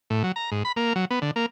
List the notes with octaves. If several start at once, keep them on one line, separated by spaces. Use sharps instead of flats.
A2
F#3
A#5
G#2
B5
A#3
F#3
B3
D3
A#3